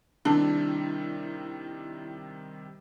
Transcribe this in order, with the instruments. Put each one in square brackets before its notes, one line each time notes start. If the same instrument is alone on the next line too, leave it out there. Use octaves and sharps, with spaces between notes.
[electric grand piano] C3 D#3 G3 [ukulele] D4 [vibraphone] E4